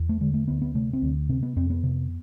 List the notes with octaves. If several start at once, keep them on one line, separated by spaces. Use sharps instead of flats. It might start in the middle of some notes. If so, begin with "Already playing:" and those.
Already playing: E2
A3
D3 G#3
A3
D2 B3
B3
C3 A3
C4
D2
C3 C4
B3
F2 C4
B3
C3